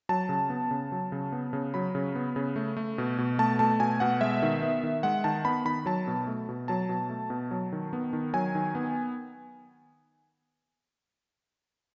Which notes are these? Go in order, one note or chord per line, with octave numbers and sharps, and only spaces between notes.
F#3 A5
C#3
B3
C#3
F#3
C#3
B3
C#3
F#3 B5
C#3
B3
C#3
A3
A3
B2
B2
A3 A5
A3 A5
B2 G#5
B2 F#5
G#3 E5
D#3
B3
D#3
G#3 F#5
D#3 A5
B3 B5
D#3 B5
F#3 A5
B2
A3
B2
F#3 A5
B2
A3
B2
F#3
D#3
B3
D#3
F#3 G#5
D#3
B3